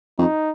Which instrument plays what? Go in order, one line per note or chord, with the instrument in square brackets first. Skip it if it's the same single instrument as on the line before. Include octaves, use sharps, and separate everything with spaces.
[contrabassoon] F2 [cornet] D#4